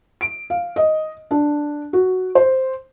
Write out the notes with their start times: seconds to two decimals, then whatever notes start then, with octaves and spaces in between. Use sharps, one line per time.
0.21 D7
0.50 F5
0.76 D#5
1.31 D4
1.93 F#4
2.35 C5